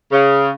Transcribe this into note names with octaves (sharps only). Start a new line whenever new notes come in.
C#3